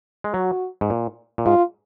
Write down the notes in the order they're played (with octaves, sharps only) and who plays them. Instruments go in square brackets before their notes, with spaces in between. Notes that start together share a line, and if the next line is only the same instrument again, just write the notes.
[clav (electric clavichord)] G#3
[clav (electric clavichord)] F#3 [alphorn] F#4
[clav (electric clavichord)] G#2
A#2
A#2
[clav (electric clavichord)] G#2 [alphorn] F4